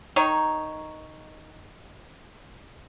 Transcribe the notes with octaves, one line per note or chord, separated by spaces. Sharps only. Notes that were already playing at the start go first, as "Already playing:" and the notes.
D#3 D#4 C#5